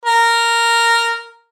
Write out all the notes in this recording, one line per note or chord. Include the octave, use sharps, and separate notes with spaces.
A#4